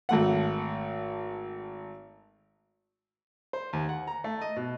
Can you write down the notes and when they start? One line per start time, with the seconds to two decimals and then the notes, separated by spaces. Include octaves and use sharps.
0.09 G#1 A3 F#5
3.53 C5
3.73 D#2
3.89 F#5
4.07 A#5
4.24 A3
4.41 D#5
4.56 B2